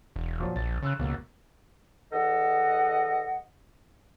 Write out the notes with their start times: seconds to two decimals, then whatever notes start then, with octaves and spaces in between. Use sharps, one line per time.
0.16 E1
0.39 A#2 F3 F#3
0.56 A#1 A6
0.82 C#3 C6 E6 F#6
0.99 C#2 B2 A#3
2.13 E2 A4 D#5 F#5